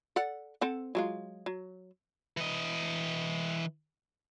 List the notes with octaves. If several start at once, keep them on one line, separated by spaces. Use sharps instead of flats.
A4 D5 F#5
C4 A4 F#5
F#3 G#3 F4
F#3
E3 D#5